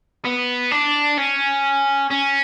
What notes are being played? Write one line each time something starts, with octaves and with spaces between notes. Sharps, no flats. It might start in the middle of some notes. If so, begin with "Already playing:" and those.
B3
D4
C#4
C#4